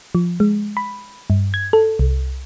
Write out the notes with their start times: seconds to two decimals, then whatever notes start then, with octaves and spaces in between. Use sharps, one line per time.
0.15 F3
0.40 G#3
0.77 B5
1.30 G2
1.54 G#6
1.73 A4
1.99 C2